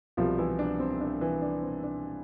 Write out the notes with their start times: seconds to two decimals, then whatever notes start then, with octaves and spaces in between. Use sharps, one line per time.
0.17 C2 B2 F3 G3 F4
0.38 E3 E4
0.59 D4
0.80 C4
1.01 D4
1.21 E3 E4
1.42 D4
1.63 C4
1.83 D4